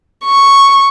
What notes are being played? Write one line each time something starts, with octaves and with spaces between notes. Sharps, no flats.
C#6